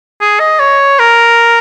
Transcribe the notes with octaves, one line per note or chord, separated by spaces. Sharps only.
G#4
D#5
C#5
A#4